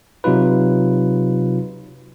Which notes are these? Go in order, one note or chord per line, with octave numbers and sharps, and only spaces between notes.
C3 F#3 D#4 F4 B4